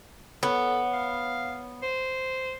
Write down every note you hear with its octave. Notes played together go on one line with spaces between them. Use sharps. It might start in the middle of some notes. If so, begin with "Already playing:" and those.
B3 A4 C#5 F#5
F5
C5